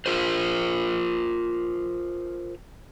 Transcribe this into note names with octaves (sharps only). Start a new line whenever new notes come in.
F4 A#4 C5